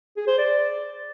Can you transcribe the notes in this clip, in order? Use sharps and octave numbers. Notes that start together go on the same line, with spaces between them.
G#4
C5
D5